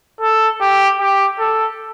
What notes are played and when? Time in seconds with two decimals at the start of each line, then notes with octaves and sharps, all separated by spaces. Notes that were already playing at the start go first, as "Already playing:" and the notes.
0.21 A4
0.60 G4
0.99 G4
1.39 A4